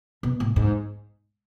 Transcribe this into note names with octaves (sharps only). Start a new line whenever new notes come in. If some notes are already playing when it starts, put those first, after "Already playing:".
B2
A2
G#2